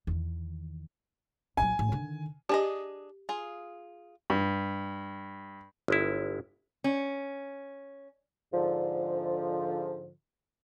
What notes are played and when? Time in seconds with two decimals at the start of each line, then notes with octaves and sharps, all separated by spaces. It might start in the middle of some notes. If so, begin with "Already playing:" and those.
0.07 E2 D#3
1.57 A#1 F#3 G#5
1.79 A1
1.92 D3 D#3
2.49 D4 G4 G#4 D#5
3.29 F4 G#4
4.30 G2
5.88 G1 G#3 E4
6.84 C#4
8.53 G#2 D3 F3